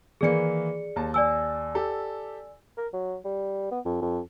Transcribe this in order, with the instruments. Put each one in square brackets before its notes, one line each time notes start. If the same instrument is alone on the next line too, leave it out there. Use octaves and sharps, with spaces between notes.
[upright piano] D#3 E3 A#3 [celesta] G#4 D5 C#7
[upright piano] D#2 A5
[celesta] D5 G#5 E6
[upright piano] G4 A4
[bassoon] A#4
F#3
G3
B3
F2
F2